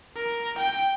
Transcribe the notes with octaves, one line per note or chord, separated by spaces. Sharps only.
A#4
G5